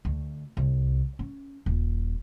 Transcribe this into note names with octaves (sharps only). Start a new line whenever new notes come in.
D2
C2
C#4
D#1